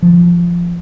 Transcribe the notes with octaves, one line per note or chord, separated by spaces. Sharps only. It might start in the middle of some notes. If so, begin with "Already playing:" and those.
F3